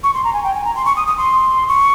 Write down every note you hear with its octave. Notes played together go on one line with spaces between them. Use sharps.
C#6
C6
A#5
G#5
G5
G#5
A#5
C6
C#6
D#6
D#6
C6
C#6